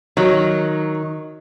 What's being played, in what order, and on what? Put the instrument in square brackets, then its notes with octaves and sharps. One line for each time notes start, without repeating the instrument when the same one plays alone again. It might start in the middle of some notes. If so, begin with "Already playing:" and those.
[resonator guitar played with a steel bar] D#3 [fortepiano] F#3